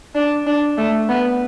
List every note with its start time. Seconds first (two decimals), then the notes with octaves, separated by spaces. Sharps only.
0.15 D4
0.47 D4
0.78 A3
1.09 B3